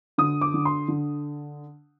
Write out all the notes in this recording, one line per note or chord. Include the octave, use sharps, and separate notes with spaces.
D3 D#6
D6
D3
C6
D3